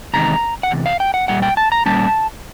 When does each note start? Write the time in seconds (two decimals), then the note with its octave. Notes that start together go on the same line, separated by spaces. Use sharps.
0.13 E2 C3 D#3 G#3 A#5
0.63 F#5
0.71 E2 C3
0.86 F5
1.00 G5
1.14 F#5
1.28 A#2 G3 F#5
1.42 G5
1.57 A5
1.72 A#5
1.86 A#2 G3 A#3 C#4 A5